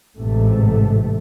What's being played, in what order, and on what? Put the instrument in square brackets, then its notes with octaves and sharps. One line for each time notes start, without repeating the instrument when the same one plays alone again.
[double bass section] A1 G#2 C3 A3